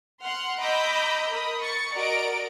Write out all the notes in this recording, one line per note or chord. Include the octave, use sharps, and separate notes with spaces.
F#5 C6 F6
D#5 A#5 B5 D6 E6 G6
A#4 B5 D#6
C#6 A6 C#7
F#4 A#4 D5 D#5 A#5 D7